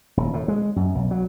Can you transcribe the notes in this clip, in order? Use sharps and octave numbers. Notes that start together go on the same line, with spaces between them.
D#1
A2
G#3
F#2
B1
F#3